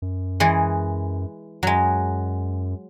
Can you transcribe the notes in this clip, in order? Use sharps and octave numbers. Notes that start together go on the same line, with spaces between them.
F#2
E3 G#3 G#4
F#2 F#3 G#3